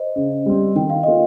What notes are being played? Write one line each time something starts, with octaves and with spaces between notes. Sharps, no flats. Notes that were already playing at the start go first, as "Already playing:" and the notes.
Already playing: C5 D#5
C#3
G3 C4
D#3 G5
F5
A#3 F4 D#5